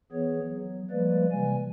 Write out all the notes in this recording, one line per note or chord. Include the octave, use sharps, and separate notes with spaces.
E3 B3 G#4 C#5
F#3
F3 G3 G#3 A#3 B4 D5
C3 E3 G3 G#5